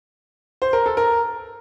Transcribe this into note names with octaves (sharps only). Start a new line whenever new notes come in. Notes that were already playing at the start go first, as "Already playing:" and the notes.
C5
A#4
A4
A#4